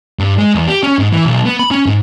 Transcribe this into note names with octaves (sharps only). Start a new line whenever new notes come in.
G2
G#3
E2
G4
C#4
G#2
E3
B1
B3
B5
C#4
G#2